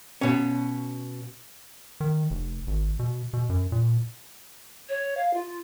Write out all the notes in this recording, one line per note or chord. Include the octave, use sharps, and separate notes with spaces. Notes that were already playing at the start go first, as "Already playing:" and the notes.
B2 C#4
D#3
F1
G#1
B2
B2
F#2
A#2
C#5
F5
F4